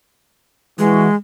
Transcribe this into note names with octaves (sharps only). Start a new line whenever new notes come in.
E3 G#3 F#4